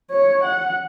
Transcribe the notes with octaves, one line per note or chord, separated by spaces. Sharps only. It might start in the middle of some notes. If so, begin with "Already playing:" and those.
C#5
F#5